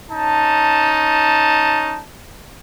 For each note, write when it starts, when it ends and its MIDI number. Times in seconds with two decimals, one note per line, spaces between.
0.11 2.00 61
0.11 2.00 63
0.11 2.00 81